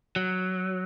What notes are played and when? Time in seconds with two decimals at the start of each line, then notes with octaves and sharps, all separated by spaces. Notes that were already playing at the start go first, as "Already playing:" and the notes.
0.16 F#3